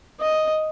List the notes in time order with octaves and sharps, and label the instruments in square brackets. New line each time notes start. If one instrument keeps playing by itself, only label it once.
[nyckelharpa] D#5